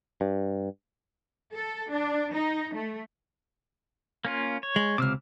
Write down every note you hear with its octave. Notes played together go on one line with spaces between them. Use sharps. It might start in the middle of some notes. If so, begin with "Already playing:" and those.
G2
A4
D4
D#4
A3
A#3 C#4 F4
C#5
G#3
C#2 C3 D6 E6 F6